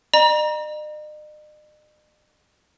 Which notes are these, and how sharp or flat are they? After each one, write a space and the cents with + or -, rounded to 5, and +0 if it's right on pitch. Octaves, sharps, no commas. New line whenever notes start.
D#5 -45 A#5 +30